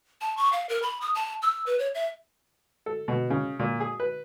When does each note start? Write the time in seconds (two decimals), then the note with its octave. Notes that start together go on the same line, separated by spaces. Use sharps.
0.21 A5
0.37 C#6
0.52 F5
0.69 A#4
0.82 B5
1.01 D#6
1.15 A5
1.42 E6
1.66 B4
1.79 C#5
1.95 E5
2.86 A4
3.08 B2
3.30 C#3
3.59 A#2
3.80 G#4
4.00 B4